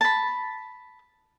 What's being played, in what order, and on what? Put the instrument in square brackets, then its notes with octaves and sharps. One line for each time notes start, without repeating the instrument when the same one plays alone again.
[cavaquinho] A5 B5